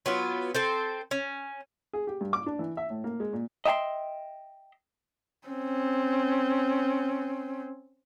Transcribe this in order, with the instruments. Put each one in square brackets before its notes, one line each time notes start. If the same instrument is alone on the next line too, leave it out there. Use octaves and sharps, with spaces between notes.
[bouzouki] F#3 B3 F4
C4 A4 C5
C#4
[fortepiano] G#4
G4
G2
D6
D4
E3
E5
A2
A#3
G#3
A#2
[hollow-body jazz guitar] D#5 E5 G5 G#5 C6
[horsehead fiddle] C4 C#4